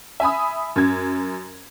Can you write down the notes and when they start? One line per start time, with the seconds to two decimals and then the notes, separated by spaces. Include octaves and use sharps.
0.20 E5 G#5 B5 D#6
0.76 F#2 G#6